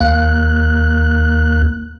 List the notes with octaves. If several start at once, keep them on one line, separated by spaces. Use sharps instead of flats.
D#2 A#3 F#6